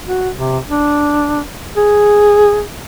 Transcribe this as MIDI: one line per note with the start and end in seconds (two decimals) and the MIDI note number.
0.06 0.29 66
0.34 0.58 48
0.69 1.41 62
1.76 2.62 68